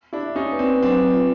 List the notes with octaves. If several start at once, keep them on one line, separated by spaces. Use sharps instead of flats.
D4 E4
D5
C#4 D#4
B4
C4 D4
F#3 C4 D4
F4